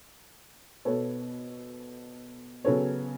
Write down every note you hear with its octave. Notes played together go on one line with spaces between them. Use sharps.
B2 B3 A4 C#5
C#3 F#3 B3 A4 C#5